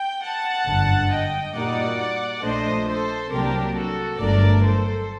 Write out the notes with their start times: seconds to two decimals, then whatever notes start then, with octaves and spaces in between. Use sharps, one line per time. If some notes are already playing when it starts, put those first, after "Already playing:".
Already playing: G5
0.22 F#5 A5
0.66 G1 F#2 D3
1.11 D#5 G5
1.55 A#2 G3 A#3 D#4 F#4 D5 F#5
2.43 A#1 A#2 A3 D4 C5 D#5
2.87 A4 C5
3.31 C2 C3 F#3 A#3 D4 G4 A#4
3.75 F#4 A4
4.19 G1 G2 F#3 A3 D4 A#4 D5
4.63 A4 C5